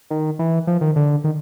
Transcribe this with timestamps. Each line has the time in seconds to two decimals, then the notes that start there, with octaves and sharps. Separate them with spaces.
0.10 D#3
0.39 E3
0.67 F3
0.81 D#3
0.96 D3
1.24 D#3